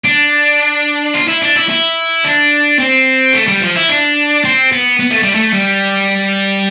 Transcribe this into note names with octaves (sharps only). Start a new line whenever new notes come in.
D4
F4
E4
D4
E4
E4
D4
C4
A3
G3
F3
E4
D4
C4
B3
B3
A3
G3
A3
G3